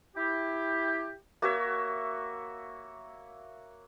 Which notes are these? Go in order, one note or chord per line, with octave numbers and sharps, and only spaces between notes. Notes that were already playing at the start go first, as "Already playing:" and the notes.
E4 G4
A#3 F#4 C#5 E5